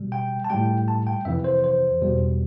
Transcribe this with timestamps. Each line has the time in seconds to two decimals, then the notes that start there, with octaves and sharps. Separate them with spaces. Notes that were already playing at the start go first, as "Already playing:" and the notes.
Already playing: B2 G3
0.12 G5
0.45 A5
0.50 A2 G3 G5
0.88 A5
1.07 G5
1.25 F2 C3 E3 E5
1.44 C5
1.64 C5
2.02 E2 B2 G3